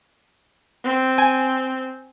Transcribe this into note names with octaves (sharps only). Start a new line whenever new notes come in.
C4
G#5